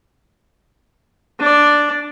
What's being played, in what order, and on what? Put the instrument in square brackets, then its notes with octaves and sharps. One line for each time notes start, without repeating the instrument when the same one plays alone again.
[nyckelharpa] D4 D5